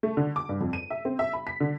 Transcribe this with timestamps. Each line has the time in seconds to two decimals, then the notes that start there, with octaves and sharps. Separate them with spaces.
0.03 A3
0.17 D3
0.36 D6
0.49 G2
0.61 F2
0.73 D#7
0.90 E5
1.05 C4
1.19 E5
1.33 B5
1.47 B6
1.60 D3